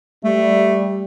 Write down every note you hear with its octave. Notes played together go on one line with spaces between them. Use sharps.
G3 A3